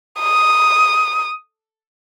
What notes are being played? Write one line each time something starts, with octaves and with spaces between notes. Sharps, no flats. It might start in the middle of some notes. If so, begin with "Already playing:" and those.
D#6